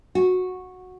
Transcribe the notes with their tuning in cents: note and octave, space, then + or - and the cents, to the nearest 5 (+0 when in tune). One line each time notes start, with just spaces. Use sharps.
F#4 -10